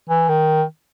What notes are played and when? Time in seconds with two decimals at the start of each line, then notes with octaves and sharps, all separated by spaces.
0.09 E3
0.29 D#3